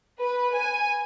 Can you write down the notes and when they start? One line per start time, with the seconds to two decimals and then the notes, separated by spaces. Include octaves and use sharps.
0.21 B4
0.55 G#5